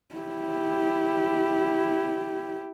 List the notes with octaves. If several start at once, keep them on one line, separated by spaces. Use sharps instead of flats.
E4 G4